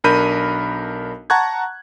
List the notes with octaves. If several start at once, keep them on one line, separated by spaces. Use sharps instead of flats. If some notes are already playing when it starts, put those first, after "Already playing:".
B1 D4 A#4 B5 G6 D#7
F#5 A5 A#5 C#6 F#6 G#6